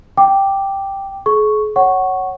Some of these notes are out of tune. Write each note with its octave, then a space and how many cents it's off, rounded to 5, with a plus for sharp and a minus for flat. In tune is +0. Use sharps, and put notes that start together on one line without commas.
G5 +0 D6 +0
G#4 +40 C#6 +0
C#5 -5 F#5 +15 C#6 -5